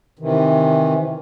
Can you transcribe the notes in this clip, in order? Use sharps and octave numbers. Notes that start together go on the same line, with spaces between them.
C3 D#3 E3